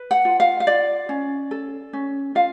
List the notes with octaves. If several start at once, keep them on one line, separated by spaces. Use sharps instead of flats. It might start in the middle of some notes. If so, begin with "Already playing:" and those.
Already playing: B4
F#5
F4
F5
F5
F4 D5
C#4
A4
C#4
F4 F5